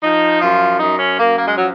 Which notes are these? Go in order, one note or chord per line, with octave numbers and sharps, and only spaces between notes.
F3 D#4
F#2 F4
F#2 D#4
C#4
F#2 A#3
A#3
G#3
F3 F#3